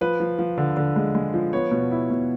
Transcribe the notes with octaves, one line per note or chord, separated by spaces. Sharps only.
F3 B4
F3
F3
D3
D3
G#3
G#3
F3
B3 C#5
B2
E4
B2